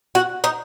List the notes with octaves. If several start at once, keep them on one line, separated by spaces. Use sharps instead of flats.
F#4
D#4